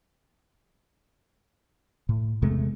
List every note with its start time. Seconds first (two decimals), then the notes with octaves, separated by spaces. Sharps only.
2.09 A2
2.42 E2 C3 G#3 A3